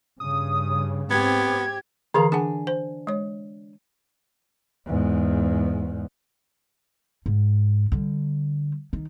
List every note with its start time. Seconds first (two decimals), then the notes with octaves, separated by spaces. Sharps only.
0.20 G2 C#3 D#6
1.11 G#2 B3 C4 G4 G#6
2.14 D3 E3 G#4 A#4 F5 A#5
2.32 D4 G#4 F#5 G#5
2.67 C5
3.07 G#3 C#5
4.86 E2 G#2
7.26 G#2
7.92 D3 G3
8.93 D#3